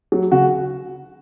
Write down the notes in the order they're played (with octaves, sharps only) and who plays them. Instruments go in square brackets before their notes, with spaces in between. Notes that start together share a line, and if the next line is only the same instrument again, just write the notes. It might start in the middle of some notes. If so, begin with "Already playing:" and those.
[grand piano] F#3
C#3 F#4